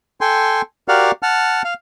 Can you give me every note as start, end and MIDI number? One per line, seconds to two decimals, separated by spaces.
0.21 0.62 69
0.21 0.62 79
0.21 0.62 80
0.21 0.62 84
0.88 1.11 66
0.88 1.11 67
0.88 1.11 70
0.88 1.11 74
0.88 1.11 77
0.88 1.11 78
1.23 1.62 78
1.23 1.62 81
1.23 1.62 89
1.64 1.74 77